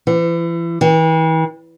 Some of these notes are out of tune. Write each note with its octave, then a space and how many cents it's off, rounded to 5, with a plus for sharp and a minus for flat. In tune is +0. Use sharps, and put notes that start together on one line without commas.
E3 +35
E3 -40